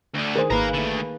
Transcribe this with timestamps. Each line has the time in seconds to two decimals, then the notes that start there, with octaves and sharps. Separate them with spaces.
0.15 D2 D3
0.36 D#3 G#4 A#4 C5
0.50 G#1 A#3 B4 F5 A#5
0.74 D3 A3